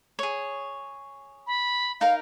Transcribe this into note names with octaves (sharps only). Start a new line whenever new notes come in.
G#4 C#5
B5
D#4 A#4 F5